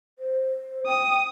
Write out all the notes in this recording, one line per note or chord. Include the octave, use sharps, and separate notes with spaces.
C5
G5 D#6